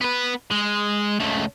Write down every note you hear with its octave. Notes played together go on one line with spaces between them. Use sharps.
B3 B4
G#3
C#2 A3